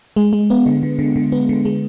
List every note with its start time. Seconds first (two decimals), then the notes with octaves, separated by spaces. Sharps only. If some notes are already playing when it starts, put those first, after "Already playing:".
0.16 G#3
0.33 G#3
0.50 B3
0.66 D3
0.83 D3
0.99 D3
1.16 D3
1.32 B3
1.49 D3
1.65 G#3